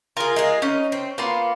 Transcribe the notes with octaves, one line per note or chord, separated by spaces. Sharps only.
F4 G#4 A#4
G#3 F4 G#4
C#4 D#4
C4
A#3 B3 F4 C6